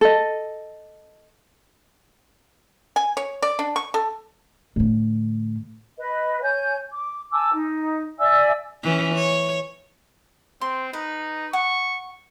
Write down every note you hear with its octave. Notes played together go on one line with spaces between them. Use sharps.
A4 D#5
G#5
C#5
D5
D4
C#6
A4
A2 D3
B4 D#5
C#5 G#5 G6
D6
G#5 A5 D6 E6
D#4
D5 E5 G#5 E6
E3 C#4
C#5
C4 C6
D#4 B4
F#5 C#6 D#6